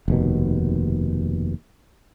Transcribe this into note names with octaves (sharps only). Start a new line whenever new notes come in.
F1 D#2 B2